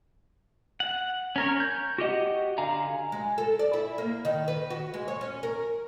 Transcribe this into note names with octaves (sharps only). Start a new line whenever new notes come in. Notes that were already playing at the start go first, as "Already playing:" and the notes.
F#5
C#4 A#4 C#5
G6
F#4 G4 D#5 F#5
D3 F5 G#5 A#5
G#3
A4
D5
E4
A#3
D#3
B4
F#4
G#3
C#5
C#4
A#4